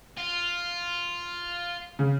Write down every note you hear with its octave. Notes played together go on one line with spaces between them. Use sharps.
F4
C#3